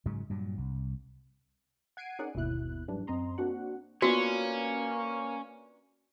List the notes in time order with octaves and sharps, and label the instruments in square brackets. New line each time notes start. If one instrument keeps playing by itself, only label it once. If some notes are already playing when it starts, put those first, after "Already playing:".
[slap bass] G#2 C#3 F#3
G2 A#2 F#3
C2
[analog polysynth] F#5 G#6 C7 D7 D#7
C#4 D#4 G#4 A#4 D5 F#5
G1 D#2 B2 E4 F#6
G#2 E3 F#3 G3 D4
F#2 C4 D#5 A#5 C6
A#3 C4 D4 F#4 F#5
[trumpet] A#3 [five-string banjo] B3 D4 F4 [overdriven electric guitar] C#4 [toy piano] F#4